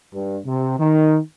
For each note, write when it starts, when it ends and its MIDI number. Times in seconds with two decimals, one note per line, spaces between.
0.14 0.39 43
0.46 0.77 48
0.79 1.17 51